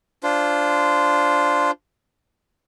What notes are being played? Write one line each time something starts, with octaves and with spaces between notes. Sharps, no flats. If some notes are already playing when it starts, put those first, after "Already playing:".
D4 F4 C5